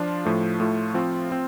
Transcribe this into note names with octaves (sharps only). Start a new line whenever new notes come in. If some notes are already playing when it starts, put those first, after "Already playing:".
Already playing: F3 D4 F4
A2 F3 A3
A2 A3 F4
F3 C4 F4
C4 F4